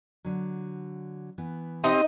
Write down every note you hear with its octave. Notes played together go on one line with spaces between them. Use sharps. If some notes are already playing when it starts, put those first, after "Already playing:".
D3 F#3
E3 B3
C4 D#4 G4 D#5